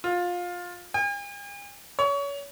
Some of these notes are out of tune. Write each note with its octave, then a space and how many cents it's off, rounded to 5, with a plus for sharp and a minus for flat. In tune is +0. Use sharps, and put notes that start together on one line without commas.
F4 +20
G#5 -45
C#5 +30